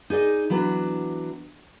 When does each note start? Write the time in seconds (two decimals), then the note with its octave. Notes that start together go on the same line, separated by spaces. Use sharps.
0.10 D#4 G#4 D5 D#5
0.50 E3 F#3 B3 D4